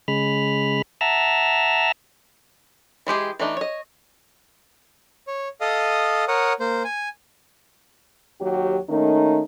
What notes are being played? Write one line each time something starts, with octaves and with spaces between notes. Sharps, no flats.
C#3 G#3 B5 F6
E5 F#5 A5 A#5 E6 F6
E3 G#3 G4 G#4
E3 A3 D4 D#4
C#5 D#5
C#5
A4 D#5 F5 D#6
A#4 C#5 F#5 D#6
A#3 C5
G#5
D#2 F#3 F#4 G4
D#3 A3 A#3 C#4 D#4